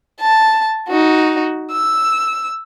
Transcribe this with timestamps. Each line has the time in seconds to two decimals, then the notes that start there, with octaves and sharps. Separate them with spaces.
0.21 A5
0.88 D#4 F#4
1.71 E6